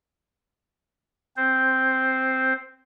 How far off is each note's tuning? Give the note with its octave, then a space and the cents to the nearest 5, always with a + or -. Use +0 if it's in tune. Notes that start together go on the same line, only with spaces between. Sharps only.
C4 +0 C5 +0